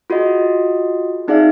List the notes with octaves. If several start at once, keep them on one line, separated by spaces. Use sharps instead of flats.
F4 F#4 G#4 D#5
C4 D#4 G#4 D5 E5 F5